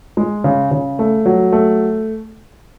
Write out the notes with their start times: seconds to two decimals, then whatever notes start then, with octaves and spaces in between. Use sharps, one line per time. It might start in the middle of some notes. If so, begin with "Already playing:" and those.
0.17 G#3
0.44 C#3
0.71 C#3
0.99 A3
1.26 F#3
1.52 A3